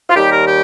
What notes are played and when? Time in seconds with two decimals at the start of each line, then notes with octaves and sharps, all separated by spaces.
0.09 F4
0.15 D#2 D#3 G3 G4
0.32 A#4
0.47 G4